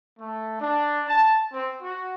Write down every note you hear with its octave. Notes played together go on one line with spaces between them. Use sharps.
A3
D4
A5
C4
F#4